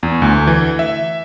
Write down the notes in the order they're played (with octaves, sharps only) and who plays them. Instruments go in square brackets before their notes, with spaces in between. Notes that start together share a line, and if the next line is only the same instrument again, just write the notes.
[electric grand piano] E2
D2
E3
E5